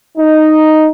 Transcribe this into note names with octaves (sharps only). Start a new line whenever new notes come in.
D#4